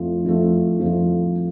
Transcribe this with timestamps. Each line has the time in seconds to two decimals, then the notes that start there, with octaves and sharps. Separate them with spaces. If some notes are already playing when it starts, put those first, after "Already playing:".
Already playing: F2 F3 A3
0.24 F2 F3 A3
0.79 F2 F3 A3